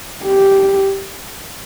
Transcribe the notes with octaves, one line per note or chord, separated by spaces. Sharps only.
G4